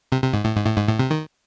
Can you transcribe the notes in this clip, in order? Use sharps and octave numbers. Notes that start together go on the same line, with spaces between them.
C3
C3
G#2
A2
G#2
A2
G#2
A2
C3
D#3